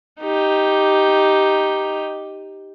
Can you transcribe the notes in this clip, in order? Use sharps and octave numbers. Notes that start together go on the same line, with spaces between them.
D#4 G4